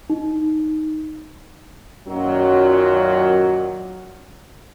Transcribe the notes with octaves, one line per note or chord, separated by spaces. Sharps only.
D#4
F#2 A#2 D#3 F#3